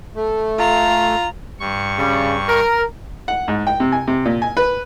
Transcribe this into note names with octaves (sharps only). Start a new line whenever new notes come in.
A3
F4 A#5
G2 C#6
C#3 G3
A#4
F#5
G#2
G5
C3
G#5
C3
A#2
G#5
B4